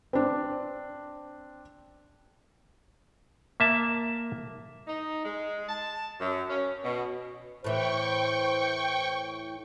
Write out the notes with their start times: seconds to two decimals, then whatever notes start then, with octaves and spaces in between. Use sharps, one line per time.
0.13 C4 D4
3.60 A#3 E5 A5
4.87 D#4
5.25 G#3
5.69 A5
6.20 F#2
6.50 C#4
6.84 B2
7.64 A2 E3 C5 G5 C#6